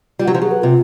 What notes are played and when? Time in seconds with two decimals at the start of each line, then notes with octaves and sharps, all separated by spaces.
0.19 G3 F4
0.27 F#3
0.30 G4
0.34 F3
0.41 F#3 G#4
0.51 B4
0.62 C3 F4